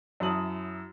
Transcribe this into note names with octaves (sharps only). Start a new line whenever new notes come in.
F#2 F#3 E4 A5 D#6 F#7